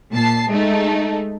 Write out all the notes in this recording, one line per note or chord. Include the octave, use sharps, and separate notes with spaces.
A#2 A5 C7
G#3 A3 D#4